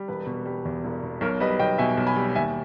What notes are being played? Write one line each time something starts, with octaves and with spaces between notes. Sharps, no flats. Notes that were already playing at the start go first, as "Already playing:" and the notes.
Already playing: G3
E1 B4
B2
G3
E2
E1
B2
B1 A#4 C#5
G3 B4 D#5
B1 D#5 G5
B2 E5 G#5
B1
G#5 B5
G3
D#2 E5 G#5